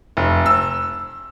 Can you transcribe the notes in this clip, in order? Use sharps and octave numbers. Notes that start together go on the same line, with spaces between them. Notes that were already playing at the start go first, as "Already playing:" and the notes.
F1
E6